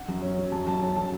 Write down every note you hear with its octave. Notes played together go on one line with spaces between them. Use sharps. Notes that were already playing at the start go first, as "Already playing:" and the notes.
Already playing: F#5
F#2
C#4
F#3
F#2 A5
F#2 A5
C#4 A5
F#3 A5